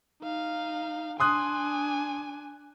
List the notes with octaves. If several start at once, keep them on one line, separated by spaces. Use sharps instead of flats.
D#4 F5
D4 G#5 C6 D#6 F#6